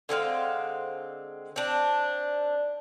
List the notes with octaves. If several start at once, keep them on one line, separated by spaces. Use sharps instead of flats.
D3 G#3 C4 F5
C4 D4